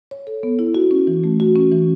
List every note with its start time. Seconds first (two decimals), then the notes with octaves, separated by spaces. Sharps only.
0.11 C#5
0.27 A4
0.43 B3
0.59 E4
0.75 F#4
0.91 C#4
1.07 E3
1.24 A3
1.40 F#4
1.56 C#4
1.72 E3